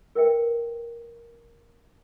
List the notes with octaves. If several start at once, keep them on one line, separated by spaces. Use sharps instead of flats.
A#4 B4 E5 G5